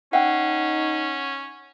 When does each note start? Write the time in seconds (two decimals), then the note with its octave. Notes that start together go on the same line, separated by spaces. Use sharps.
0.13 C#4 D#4 E5 F#5 G5